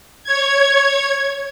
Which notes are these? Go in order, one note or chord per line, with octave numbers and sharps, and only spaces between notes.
C#5 G#6